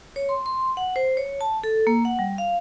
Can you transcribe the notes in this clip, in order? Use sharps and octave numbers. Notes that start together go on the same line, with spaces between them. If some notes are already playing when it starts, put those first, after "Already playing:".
C#5
C6
C6
F#5
C5
C#5
A5
A4
A#3
F#5
G3
F5